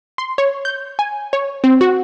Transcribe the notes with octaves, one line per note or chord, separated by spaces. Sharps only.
C6
C#5
G6
G#5
C#5
C4
F#4